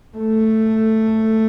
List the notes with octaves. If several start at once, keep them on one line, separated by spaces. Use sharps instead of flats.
A3